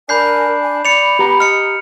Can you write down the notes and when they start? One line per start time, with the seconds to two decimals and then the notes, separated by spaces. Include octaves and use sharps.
0.09 D4 A#4 G#5 B5 G6 C7
0.61 G#5
0.85 D5 B5 C#7 F7
1.19 B3 G4 A#5
1.40 D#5 F6 C#7